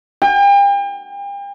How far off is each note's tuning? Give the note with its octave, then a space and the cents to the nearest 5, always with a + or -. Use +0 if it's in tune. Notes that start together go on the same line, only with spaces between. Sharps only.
G5 +40